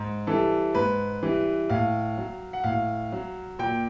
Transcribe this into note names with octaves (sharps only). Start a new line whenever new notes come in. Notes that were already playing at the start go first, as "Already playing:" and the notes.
Already playing: G#2
E3 G3 A4
G#2 B4
E3 G3
A2 F5
F#3
F#5
A2 F5
F#3
A#2 G5